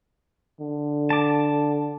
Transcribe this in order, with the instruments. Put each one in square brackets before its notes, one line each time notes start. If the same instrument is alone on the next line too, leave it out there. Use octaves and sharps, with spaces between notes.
[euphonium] D3
[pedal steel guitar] A5 D6